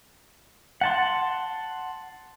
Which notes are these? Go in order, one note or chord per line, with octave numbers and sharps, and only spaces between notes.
F#5 A5 C6